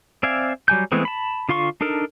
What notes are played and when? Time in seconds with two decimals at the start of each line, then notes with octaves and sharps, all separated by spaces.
0.23 C4 D5 E5 F5 G#5
0.68 F#3 G3 G#5 G6
0.92 E3 G#3 A3 B3 C4
1.05 A5 B5
1.49 D3 F4 F5 C6 C#6
1.81 D4 D#4 A4 A#4